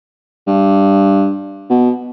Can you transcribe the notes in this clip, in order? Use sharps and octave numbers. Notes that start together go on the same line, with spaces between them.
G2
B2